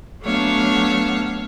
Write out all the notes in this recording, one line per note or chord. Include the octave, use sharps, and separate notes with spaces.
F#3 A3 B3 D4 C#5 F5